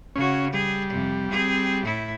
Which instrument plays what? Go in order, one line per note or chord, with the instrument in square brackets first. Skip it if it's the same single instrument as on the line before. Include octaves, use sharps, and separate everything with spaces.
[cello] C#3 F#4 [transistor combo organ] C#4
[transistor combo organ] G3 [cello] G#4
[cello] F2 C3
C4 G#4
A2 E4